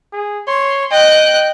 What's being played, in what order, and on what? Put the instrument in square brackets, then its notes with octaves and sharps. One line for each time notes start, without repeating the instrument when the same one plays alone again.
[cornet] G#4
[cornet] C#5 [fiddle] C6
[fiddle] D#5 F#6 [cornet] G5